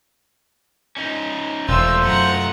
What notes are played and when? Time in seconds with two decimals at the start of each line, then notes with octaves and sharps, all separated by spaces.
0.97 C#4 D#4
1.68 E1 A3 F4 C5 E6
2.05 F#2 F#5 A#5